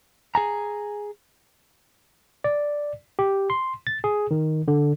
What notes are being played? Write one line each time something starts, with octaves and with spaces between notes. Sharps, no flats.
G#4 G#5 A#5
D5
G4
C6
A6
G#4
D#3
D3